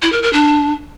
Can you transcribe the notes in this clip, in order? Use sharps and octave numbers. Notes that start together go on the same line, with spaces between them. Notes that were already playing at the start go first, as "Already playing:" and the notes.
E4
A#4
A#4
D4